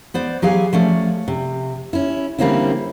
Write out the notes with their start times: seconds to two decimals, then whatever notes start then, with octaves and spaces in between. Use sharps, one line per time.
0.14 B3 C5 D5
0.42 F#3 G4 G#4 F5 G#5
0.73 F3 A3 C#4 D5
1.28 C3
1.93 C#4 E4
2.38 D3 G3 A#3 C4 C#4 E4